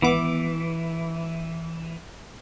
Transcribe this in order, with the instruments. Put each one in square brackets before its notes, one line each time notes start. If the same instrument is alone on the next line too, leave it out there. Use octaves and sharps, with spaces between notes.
[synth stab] G#1 B3 D6 [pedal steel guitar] E3